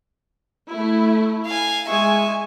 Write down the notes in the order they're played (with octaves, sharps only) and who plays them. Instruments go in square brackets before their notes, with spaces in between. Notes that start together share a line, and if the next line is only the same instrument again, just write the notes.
[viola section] A3 E4
[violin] F5 G#5
[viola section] G#3 G#5 [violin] E5 C#6